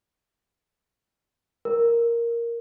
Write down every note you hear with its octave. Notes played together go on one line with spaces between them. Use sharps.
A#4